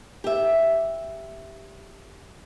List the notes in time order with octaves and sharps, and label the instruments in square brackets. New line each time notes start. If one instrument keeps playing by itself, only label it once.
[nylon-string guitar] G4 E5